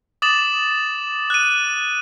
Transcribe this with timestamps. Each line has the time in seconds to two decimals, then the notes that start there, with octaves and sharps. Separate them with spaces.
0.22 D6 D#6 A6 E7 F#7
1.30 F#6 D#7